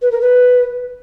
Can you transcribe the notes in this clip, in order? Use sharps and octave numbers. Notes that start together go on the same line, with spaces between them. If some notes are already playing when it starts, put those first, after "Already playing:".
B4
A#4
B4